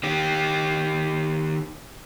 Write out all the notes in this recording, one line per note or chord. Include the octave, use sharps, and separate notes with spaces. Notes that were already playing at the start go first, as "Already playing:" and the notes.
D#3 G4